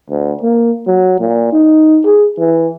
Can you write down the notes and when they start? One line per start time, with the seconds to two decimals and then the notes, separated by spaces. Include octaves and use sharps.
0.10 D2
0.42 A#3
0.87 F#3
1.20 A#2
1.52 D#4
2.05 G#4
2.39 E3